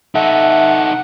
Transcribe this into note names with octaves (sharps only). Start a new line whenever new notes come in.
D#4 A4 E5 F#5